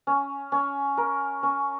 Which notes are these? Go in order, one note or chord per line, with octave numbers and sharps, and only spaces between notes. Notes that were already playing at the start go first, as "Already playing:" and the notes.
C#4
C#4
A#4
C#4